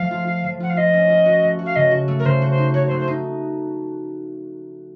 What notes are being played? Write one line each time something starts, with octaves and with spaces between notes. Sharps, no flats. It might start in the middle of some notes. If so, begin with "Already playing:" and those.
Already playing: F3 A3 F5
F4
F4
F3
F4 F#5
F5
F4 D#5
C#4
F4
F#4
A3
F#4
F5
C#3 D#5
F#4
A3
A#4
C#3 C5
F#4
C5
D#4
F#4 C#5
C5
A3
C5
D#4